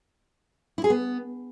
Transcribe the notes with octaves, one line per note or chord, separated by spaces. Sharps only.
E4
G#4
B3